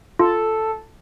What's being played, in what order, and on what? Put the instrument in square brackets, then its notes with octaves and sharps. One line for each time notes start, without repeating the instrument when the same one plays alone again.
[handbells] F4 [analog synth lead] A4